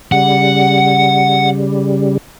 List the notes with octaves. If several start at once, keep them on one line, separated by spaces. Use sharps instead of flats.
C#3 G3 F#5